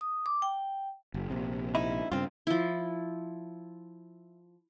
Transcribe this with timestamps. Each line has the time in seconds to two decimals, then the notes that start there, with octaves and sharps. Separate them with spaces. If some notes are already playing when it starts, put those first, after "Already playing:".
0.01 D#6
0.26 D6
0.42 G5
1.14 F#1
1.30 A#1 C3
1.75 D#4 E4
2.12 G2 C#3 C4 F4
2.47 F3 E4